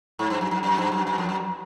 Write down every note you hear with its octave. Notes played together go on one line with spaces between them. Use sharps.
G#2
G2
F#2
F#2
F#2
G2
F#2
F#2
F2
F#2